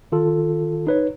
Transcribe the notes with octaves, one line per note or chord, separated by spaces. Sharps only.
D#3 F4 A4
D#4 B4 C#5